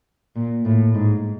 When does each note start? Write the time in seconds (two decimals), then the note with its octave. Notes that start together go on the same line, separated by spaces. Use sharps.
0.36 A#2
0.65 A2
0.94 G#2